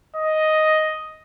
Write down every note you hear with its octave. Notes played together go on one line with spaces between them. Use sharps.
D#5